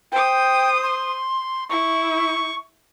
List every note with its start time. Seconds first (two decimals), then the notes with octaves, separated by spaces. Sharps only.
0.12 C5 G5 D#6
0.83 C6
1.69 E4 C#6